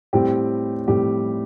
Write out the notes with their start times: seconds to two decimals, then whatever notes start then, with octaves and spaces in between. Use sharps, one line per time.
0.13 A2 G3 C4 G4
0.87 A2 G3 C4 G4